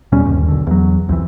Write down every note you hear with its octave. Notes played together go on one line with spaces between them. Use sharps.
E2 B2 G3 C#4
G1 D#2
B1 D3
E2 F#3
C2 F2 E3